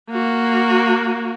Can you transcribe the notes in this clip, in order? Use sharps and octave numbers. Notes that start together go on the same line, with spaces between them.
A#3 F#4